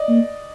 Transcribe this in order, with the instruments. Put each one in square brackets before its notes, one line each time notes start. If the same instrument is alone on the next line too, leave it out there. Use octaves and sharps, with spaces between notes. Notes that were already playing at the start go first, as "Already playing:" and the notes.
Already playing: [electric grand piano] D5 D#5
[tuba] A#3